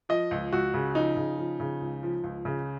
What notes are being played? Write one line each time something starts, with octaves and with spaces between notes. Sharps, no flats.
F3 D#5
C#2
C#2 F#4
C#3
F3 D#4
C#3
F3
C#3
C#2
F3
C#2
C#3